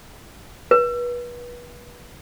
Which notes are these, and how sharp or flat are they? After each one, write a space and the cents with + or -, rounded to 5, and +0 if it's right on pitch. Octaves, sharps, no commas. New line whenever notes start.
B4 -30